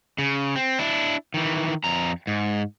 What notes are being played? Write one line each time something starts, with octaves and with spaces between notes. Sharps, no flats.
C#3
C4
D4 E4
D#3 E3
F2 A#5
G#2